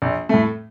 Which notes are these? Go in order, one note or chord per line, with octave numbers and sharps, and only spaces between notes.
A#1
A2 A3